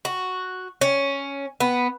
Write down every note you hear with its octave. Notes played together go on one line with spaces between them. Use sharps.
F#4
C#4
B3